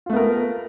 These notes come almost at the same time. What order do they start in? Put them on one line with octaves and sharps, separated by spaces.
F4 A3 B3 A#4